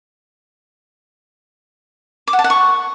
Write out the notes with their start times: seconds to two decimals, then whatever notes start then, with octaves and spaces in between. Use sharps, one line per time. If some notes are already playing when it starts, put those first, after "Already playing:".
2.27 D6
2.33 F#5
2.39 A5
2.44 F#5
2.50 C#6